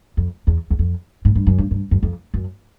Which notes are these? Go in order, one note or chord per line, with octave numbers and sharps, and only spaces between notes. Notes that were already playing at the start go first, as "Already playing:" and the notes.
F2
E2
E2
F2
G#2
G2
F#2
G2
G2
F#2
F2
F#2